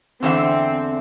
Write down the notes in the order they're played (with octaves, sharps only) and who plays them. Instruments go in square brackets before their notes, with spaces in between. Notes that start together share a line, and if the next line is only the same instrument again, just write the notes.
[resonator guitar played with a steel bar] E2 D3 E5 [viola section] C4